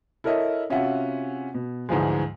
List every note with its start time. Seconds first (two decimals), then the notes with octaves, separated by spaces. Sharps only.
0.24 E4 A4 A#4 C#5 D#5 E5
0.70 C3 C#4 F4 F#4 E5 F#5
1.54 B2
1.89 D2 G#2 E3 F3 G#3